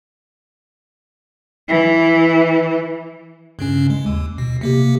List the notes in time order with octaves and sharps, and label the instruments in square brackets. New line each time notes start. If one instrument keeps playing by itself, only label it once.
[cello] E3
[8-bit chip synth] G2 C#3 C#4
G#3
D#2
B2
C3 A#3 G4